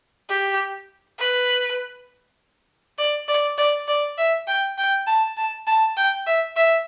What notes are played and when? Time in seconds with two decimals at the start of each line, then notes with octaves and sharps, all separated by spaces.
0.30 G4
1.19 B4
2.98 D5
3.29 D5
3.58 D5
3.88 D5
4.18 E5
4.48 G5
4.78 G5
5.07 A5
5.37 A5
5.67 A5
5.97 G5
6.27 E5
6.56 E5